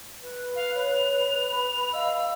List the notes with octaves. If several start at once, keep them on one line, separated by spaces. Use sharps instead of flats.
B4
F5
C#5 F7
B5
D#5 F5 E6